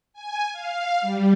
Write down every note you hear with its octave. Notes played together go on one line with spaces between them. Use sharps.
G#5
F5
G3